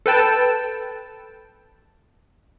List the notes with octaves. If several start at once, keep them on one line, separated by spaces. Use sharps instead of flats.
A4 B4 G5 A5